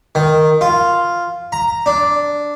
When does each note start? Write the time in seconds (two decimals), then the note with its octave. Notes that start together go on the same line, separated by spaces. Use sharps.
0.15 D#3
0.61 F4
1.52 A#5
1.86 D4